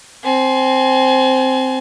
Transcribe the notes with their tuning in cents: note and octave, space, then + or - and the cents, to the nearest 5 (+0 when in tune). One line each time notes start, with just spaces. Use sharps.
C4 +0 G#5 +35